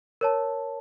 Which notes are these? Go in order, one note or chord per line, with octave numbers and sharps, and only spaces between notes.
A#4 C#5 A5